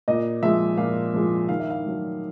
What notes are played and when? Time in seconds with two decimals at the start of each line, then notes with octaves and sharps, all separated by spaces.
0.08 A#2 D#5
0.42 F3 G#3 E5
0.77 A#2 F5
1.14 F3 G#3
1.49 D#3 F5
1.60 E5
1.70 F5
1.84 F#3 A3